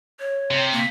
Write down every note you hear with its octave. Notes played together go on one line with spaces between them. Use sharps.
C#5
C3
A#3